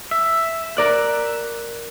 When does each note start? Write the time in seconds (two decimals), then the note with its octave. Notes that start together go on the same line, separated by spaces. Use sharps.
0.11 E5
0.77 A#4 D5 F#6